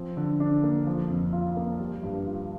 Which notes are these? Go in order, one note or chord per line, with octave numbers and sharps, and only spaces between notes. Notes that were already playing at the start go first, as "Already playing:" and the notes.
Already playing: F3 C4
D3
D4
A#3
F3
F2
F4
A#3
G3
G2
F4